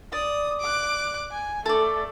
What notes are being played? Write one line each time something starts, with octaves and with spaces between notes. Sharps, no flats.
D5 D#6
D6 F#6
G#5
A3 A4 D5